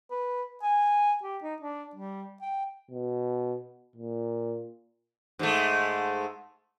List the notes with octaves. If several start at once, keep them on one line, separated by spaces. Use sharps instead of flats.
B4
G#5
G4
D#4
D4
G3
G5
B2
A#2
G#2 G#3 A3